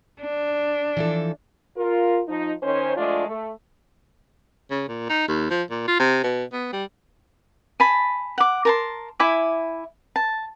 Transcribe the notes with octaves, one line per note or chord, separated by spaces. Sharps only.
D4
E3 F3 A4
F4 A#4
F3 D#4
D#3 C#4 C5
F3 G#3 A3 D4 F4 D5
A3
C#3
A#2
D#4
D#2
F3
A#2
F4
C3
B2
B3
G3
G#5 A5 B5
F#5 D6
A#4 A5 C6
E4 E5 G#5 D6
A5